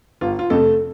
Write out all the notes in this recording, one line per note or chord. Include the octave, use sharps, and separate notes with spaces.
G1 F4
F4
F2 C3 A3 A4